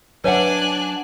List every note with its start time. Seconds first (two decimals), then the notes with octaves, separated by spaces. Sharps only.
0.24 F#3 D4 B4 C#5 E5 F#5 G#5 F#6